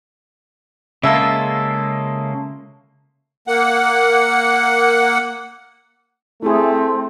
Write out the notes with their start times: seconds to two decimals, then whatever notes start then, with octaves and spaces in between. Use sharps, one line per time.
1.03 C#3 G#3 A#3 F4 A4 E5
3.48 A#3 F#5
6.43 A3 C4 E4 G#4